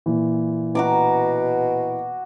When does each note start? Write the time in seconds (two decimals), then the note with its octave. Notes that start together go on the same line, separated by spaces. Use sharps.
0.06 A#2 E3
0.75 B2 F#4 A#5 D6